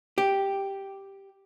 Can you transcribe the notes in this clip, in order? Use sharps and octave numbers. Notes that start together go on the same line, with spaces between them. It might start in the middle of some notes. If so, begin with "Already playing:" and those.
G4